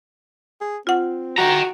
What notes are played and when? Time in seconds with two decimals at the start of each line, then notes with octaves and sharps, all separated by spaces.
0.61 G#4
0.87 C4 F4 F#5
1.38 F#4 G5 A#5